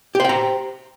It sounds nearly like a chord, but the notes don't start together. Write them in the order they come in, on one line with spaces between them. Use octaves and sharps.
G4 C5 G5 A#5